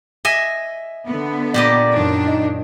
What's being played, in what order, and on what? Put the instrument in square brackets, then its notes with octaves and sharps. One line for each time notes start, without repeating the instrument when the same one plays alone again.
[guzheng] D#5 E5 G#5
[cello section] D3 B3
[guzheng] A#2 G4 D#5 [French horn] D5
[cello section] F#2 D#3 D4
[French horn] D#4